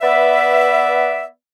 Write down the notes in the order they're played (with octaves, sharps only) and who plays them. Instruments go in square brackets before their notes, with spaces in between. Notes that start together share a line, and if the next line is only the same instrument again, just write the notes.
[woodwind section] B3 B4 D5 E5